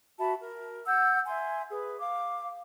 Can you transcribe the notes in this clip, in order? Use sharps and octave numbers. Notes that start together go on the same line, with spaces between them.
F#4 E5 A5 B5
A#4
F#5 E6 G6
E5 G#5 C6
G#4 B4
F5 D6